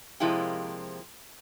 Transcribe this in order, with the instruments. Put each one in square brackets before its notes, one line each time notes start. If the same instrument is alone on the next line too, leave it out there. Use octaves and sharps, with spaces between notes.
[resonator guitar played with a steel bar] C3 F3 G#3 A#3 E4 G4